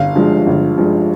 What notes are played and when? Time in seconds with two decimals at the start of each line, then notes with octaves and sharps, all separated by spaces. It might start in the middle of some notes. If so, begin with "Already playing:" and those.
Already playing: G1 F5
0.15 G2 F3 G#3
0.47 G1
0.77 G2 F3 G#3